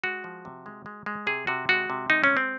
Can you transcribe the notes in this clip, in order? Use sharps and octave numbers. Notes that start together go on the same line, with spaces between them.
G#3 F#4
F3
C3
G#3
G#3
G#3
C3 G#4
C3 F#4
G#3 F#4
C3
G#3 D#4
C#4
G#3
C4